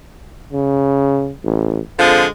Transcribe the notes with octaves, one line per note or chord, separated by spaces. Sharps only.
C#3
A1
F2 D3 F3 G#3